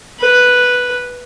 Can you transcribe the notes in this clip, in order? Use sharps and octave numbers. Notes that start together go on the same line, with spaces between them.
B4